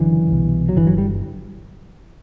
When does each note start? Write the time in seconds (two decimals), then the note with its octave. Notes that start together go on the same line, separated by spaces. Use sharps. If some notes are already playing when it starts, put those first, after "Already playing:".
Already playing: F#1 F#2 D3 E3
0.31 C2 B2
0.69 F#3
0.76 G1 G2 D3 E3
0.87 F#3
0.98 G3